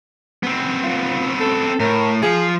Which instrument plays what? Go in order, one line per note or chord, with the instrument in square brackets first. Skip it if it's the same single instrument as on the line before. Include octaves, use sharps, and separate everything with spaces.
[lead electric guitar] B3 C4
[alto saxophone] F4
A4
[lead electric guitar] A2 [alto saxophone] A#4
[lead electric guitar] F3 F4 [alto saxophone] G#4